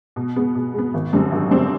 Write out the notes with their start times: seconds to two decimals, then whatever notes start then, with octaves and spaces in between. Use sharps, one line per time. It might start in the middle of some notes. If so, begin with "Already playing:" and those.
0.16 B2
0.36 G#3 B3
0.55 B2
0.74 G#3 B3
0.94 G#1
1.13 F#2 D3 G3 C4
1.32 G#1
1.51 F#2 D3 G3 C4